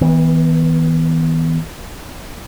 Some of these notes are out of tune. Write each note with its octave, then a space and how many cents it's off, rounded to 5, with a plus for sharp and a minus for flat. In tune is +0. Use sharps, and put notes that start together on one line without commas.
E3 -40 B3 +0